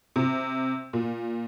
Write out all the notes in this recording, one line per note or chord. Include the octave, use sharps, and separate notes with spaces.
C3
A#2